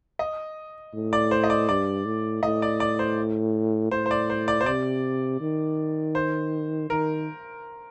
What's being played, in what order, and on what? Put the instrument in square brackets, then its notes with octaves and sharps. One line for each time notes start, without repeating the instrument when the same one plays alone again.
[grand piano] D#5
[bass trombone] A2
[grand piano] D5
C5
D#5
D5
[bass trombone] G2 [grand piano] D5
[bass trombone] A2
[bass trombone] A2 [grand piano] D#5
[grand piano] D5
D5
C5
[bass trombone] A2 [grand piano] C5
[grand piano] C5
D5
C5
D5
C5
[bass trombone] C3 [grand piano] D5
[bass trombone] D#3
[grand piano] C5
[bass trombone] D#3 [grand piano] A#4